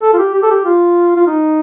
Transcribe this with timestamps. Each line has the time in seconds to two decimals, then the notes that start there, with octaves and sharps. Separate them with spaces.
0.02 A4
0.13 F4
0.18 G4
0.34 G4
0.42 A4
0.50 G4
0.65 F4
1.16 F4
1.27 D#4